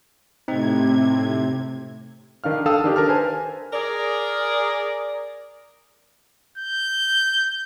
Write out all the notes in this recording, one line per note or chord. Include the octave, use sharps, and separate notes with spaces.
A2 C3 C4 D#4 G#6
D#3 D4 F5 F6
A4 F5 G5 A5 D#6 E6
D#3 D4 G4
A#4 A5 F6
B4 C5 G#5
G#4 A#4 D5
G6